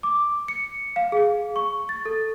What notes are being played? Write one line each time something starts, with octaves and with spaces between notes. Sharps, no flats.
D6
C#7
F5
G#4
C#6
A6
A4